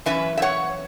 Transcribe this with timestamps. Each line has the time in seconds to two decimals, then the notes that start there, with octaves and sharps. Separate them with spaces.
0.06 F#2 E3 C#4 B4 E5
0.37 E5
0.42 C#5 F#5